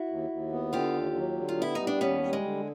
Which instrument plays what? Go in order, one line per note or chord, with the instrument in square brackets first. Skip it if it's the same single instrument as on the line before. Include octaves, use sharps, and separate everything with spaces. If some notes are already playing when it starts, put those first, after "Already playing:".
Already playing: [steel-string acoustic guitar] E4 F#4
[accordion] D#2
D#2
B3
[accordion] D3 [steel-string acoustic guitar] F4 G4
[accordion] D#2
F#3
D3
[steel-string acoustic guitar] F4
[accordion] B3 [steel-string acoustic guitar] E4
[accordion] G3 [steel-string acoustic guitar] D#4
[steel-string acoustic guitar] D4
[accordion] D#2 [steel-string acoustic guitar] B3 C#4
[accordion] G3
[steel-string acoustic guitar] G#3
[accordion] D3